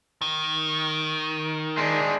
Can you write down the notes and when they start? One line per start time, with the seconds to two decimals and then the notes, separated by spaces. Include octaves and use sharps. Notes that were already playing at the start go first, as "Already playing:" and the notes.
0.22 D#3
1.77 G#3 D4